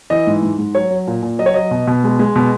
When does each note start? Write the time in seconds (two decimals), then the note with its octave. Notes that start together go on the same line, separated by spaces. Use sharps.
0.10 E3 D#5
0.27 G#2
0.43 G#2
0.58 G#2
0.75 F#3 C#5
0.90 F#3
1.07 A#2
1.22 A#2
1.39 F#3 D#5
1.46 C#5
1.54 F#3 D#5
1.71 B2
1.87 B2
2.04 G#3
2.19 G#3
2.36 B2